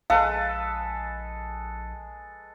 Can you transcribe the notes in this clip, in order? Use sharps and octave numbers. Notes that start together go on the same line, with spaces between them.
A#1 G#3 A4 B4 F5